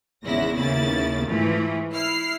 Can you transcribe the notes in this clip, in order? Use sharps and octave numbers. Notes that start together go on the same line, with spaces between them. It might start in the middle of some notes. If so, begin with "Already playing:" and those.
G#1 E2 C#3 B3 E4 A#6
D#2 C#3 A#3 B3 E4 A6
G#2 E3 F3 A3
E4 F6 C7